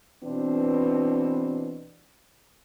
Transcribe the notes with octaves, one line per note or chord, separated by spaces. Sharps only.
B2 E3 C4 D4